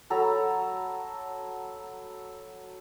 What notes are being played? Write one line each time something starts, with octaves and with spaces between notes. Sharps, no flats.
F#3 A4 A#5 B5